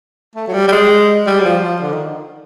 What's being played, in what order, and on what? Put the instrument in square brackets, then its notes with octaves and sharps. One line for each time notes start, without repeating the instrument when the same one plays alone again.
[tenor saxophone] A3
F#3
G3
G3
G#3
G3
F#3
F3
F3
D3
D#3